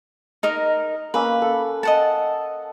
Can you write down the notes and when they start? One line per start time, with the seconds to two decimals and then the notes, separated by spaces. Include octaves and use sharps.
0.43 D#4 A#4 D#5
1.14 A#3 C#4 B4 E6
1.42 A4
1.83 D#5 F#5 A5